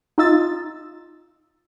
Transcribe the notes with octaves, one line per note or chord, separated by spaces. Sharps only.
D#4 F4 D#5 E6 A6